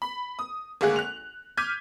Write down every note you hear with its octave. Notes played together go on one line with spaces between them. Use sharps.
B5
D#6
G#1 D2 G#3 A#3 G#4 F#6
F#6 F7
D6 F6 G6 G#6 B6 D#7